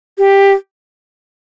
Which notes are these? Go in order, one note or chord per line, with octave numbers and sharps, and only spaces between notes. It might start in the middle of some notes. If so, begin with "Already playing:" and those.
G4